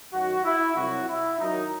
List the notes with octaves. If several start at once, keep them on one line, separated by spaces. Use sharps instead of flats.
F#2 D#3 F#3 F#4
E4
C2 C3 F#3 F#4
E4
F#2 D#3 F#3 D#4